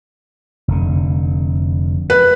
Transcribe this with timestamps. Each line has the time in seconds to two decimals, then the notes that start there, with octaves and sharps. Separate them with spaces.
0.68 F1 D3
2.10 B4